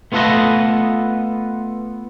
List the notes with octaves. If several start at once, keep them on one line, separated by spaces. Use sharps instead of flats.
A3 B3 F4 A4 B4 D#5